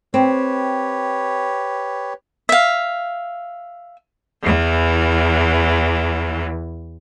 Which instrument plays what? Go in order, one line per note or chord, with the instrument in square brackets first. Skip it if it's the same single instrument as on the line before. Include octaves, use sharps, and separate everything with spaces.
[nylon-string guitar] C4 [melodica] G4 B4 C#5
[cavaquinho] E5 F5
[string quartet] E2 E3